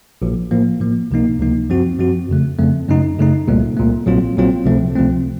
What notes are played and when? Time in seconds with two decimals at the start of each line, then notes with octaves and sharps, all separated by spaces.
0.22 A#1 A#2 F3
0.51 A2 F3 A#3
0.80 A2 F3 A#3
1.11 C#2 C3 F3 A#3 D#4
1.40 C#2 C3 F3 A#3 D#4
1.70 F#2 F3 C4 F#4
1.99 F#2 F3 C4 F#4
2.29 F2 C#3 A3
2.58 F2 C#3 A3
2.88 F#2 C#3 A3 D#4
3.18 F#2 C#3 A3 D#4
3.48 C2 A#2 A3
3.77 C2 A#2 A3
4.06 A#1 A#2 F#3 C4 F4
4.37 A#1 A#2 F#3 C4 F4
4.65 C#2 C3 F3 A3 C4
4.96 C#2 C3 F3 A3 C4